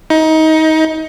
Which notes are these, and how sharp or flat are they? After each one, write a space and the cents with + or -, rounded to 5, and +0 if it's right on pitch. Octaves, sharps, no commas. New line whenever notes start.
D#4 +25